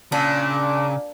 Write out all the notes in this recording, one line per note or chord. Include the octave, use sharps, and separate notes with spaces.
A#2 C#3 D4